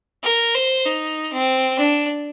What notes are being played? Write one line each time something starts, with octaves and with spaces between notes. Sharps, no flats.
A#4
C5
D#4
C4
D4